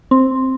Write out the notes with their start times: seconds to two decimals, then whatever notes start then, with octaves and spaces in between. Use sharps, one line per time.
0.11 C4